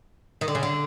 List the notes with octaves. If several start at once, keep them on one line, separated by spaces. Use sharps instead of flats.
D#3
D3
C#3
D3